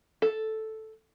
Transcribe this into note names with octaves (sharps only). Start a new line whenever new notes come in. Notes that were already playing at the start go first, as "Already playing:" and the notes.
A4